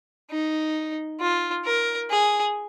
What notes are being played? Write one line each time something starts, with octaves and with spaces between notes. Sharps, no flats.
D#4
F4
A#4
G#4